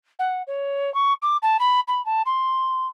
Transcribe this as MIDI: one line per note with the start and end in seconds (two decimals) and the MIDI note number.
0.19 0.42 78
0.47 0.93 73
0.94 1.13 85
1.22 1.37 86
1.42 1.57 81
1.59 1.80 83
1.87 2.04 83
2.05 2.22 81
2.26 2.87 84